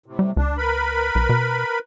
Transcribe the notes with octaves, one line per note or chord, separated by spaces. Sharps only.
A2 C3
G3
C#2 D4
A#4 B4 B5
B1
B2